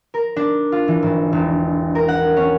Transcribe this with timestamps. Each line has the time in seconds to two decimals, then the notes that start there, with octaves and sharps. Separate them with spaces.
0.14 A#4
0.36 D4
0.72 F4
0.88 E3
1.03 G#1
1.33 E1
1.95 A#4
2.08 F#5
2.37 C#4